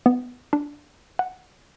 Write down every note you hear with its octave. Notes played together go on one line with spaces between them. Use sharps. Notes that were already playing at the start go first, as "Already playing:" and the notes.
B3
D4
F#5